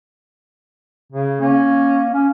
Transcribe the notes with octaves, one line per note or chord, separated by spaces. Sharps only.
C#3
A#3 C#4
C#4